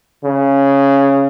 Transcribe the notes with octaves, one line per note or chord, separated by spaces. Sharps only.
C#3